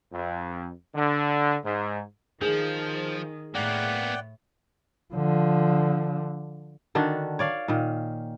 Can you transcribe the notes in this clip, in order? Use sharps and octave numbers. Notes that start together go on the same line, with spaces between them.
F2
D3
G#2
D#3 F3 G#4
A2 A#3 B3 D5 F#5 G5
D3 F3
D3 D#3 D4 F#4
C#5 D5 F5
A#2 D#3